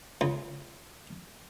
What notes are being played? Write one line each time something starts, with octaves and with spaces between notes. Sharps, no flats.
C#2